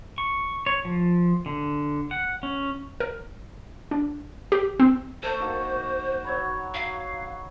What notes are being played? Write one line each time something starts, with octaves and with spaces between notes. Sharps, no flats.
C#6
C#5
F3
D3
F#5
C#4
A#4
D4
G4
C4
A3 A4 C5
D#3 A#3 F#4
F#3 C#5 B5
F5